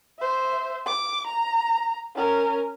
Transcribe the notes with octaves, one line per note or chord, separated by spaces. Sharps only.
C5 E5
D6
A#5
C#4 A#4